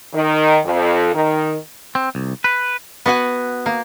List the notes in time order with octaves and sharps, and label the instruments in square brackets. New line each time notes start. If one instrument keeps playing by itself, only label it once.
[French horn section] D#3
F2
D#3
[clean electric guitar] C4
C2
B4
[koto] B3 F#4 F#5 G#5
A#3